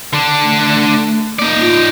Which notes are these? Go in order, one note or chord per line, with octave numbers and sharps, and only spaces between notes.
D3 D4
A3
A#3 D#4 D5
F4